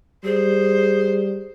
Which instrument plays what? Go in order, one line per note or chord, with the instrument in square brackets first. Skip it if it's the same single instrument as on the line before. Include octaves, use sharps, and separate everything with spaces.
[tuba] G3 [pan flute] G#4 [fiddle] C5